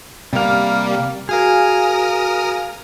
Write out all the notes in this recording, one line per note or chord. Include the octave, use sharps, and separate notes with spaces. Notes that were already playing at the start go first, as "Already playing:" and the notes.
C3 G3 A#3 F5
F#4 G#4 A#4 F5 D#6 F6